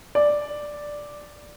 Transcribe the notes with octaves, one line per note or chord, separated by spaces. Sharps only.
D5